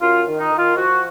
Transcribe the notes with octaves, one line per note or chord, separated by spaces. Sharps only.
F#2 F4
D#3
D#4
D#3
F4
F3 F#4